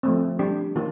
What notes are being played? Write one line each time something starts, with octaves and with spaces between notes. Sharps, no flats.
F3 A3 C4
G3 D4 G4
D#3 A#3 F4